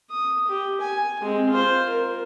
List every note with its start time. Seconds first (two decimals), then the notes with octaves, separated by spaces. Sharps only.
0.10 D#6
0.47 G4
0.81 G#5
1.22 G#3 C4
1.50 F4 C5
1.89 A#4